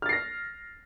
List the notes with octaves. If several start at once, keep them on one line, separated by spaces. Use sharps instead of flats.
F6 A6 A#6 C7